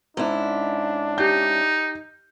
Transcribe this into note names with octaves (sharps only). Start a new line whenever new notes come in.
G#2 C#4 D4 E4
D#4 G4 G6